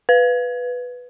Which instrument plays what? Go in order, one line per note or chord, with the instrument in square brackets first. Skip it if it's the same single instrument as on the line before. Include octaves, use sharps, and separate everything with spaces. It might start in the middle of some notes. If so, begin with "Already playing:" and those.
[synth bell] B4